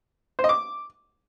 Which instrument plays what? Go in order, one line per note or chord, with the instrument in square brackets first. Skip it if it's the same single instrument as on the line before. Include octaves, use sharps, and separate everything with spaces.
[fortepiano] C5
D#5
D6